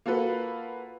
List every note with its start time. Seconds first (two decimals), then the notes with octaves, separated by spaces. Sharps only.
0.06 A#3 F4 F#4 A4 B4